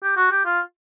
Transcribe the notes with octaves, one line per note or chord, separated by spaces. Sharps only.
G4
F#4
G4
F4